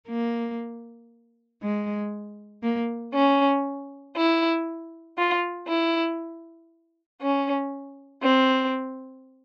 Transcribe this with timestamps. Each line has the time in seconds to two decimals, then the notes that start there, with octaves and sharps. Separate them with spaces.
0.09 A#3
1.62 G#3
2.63 A#3
3.13 C#4
4.16 E4
5.18 F4
5.68 E4
7.20 C#4
8.21 C4